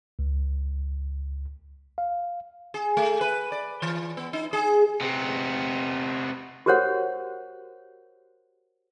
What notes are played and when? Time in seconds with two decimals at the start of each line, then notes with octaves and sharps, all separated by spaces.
0.19 C#2
1.98 F5
2.74 G#4
2.97 A3
3.21 B4
3.52 D5
3.82 E3
4.17 B3
4.33 D#4
4.53 G#4
5.01 C3 B3
6.66 F#4 G4 A#4 C5 C#5 F#5